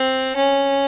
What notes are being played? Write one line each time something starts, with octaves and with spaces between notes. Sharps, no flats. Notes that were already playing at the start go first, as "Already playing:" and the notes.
Already playing: C4
C#4